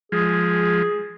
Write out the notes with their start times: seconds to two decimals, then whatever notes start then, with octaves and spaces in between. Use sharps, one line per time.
0.12 F3 G#3 G#4